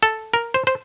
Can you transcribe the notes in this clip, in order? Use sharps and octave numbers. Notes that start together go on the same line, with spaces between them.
A4
A#4
C5
C5